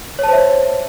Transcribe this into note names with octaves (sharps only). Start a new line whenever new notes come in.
C5 C#5 E5 A5